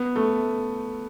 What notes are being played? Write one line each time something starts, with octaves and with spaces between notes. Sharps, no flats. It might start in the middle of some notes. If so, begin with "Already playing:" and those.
Already playing: B3
A3